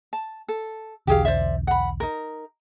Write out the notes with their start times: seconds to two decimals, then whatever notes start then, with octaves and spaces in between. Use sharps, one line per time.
0.13 A5
0.48 A4
1.07 B1 E2 D3 G4 G#4 F5
1.25 C5 D5 E5
1.67 F#5 B5
2.00 D#4 A#4